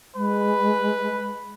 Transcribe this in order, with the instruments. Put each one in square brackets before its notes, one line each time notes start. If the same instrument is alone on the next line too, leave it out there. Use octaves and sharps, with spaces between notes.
[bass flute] G#3 [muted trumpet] B4